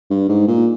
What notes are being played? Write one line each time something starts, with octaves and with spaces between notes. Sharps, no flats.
G2
G#2
A#2